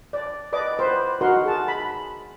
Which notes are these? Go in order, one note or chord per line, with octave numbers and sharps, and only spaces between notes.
D5
B4 D5 D#5 D6
B4 C5
D#4 F#4 A#4 F#5 C6
G#4 A5
B5